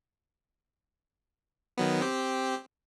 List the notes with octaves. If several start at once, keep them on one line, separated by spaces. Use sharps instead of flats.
D#3 F#3 B3
C4 G4